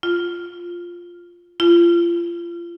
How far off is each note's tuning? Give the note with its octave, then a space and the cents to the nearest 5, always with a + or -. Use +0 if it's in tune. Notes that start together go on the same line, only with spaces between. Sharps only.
F4 +0
F4 -30